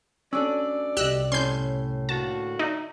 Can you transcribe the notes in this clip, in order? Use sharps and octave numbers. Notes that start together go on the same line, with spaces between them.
B2 A3 C#4 D4 A4 D5 E6
C2 C3 G4 D#5 E6 F#6
A2 C#4 C6 G6
D3 A#3 F#4 A5
D#4 D5 E5